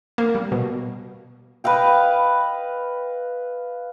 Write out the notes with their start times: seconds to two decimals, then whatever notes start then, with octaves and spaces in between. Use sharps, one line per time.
0.18 A#3
0.35 G3
0.52 B2
1.64 B4 D#5 F5 G5